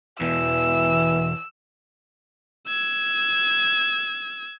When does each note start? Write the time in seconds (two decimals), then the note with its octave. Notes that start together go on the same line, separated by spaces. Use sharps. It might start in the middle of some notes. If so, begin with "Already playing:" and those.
0.21 E2 B2 E3 E6
2.67 E6 G#6